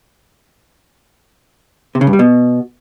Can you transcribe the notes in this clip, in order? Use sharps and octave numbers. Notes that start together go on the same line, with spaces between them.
C3
C#3
G2
G3
B2